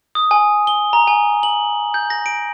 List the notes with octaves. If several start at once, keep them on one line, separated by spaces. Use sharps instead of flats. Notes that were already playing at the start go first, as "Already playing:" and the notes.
D#6
G#5
G7
A#5
G#5
F#7
G6
A#6
D7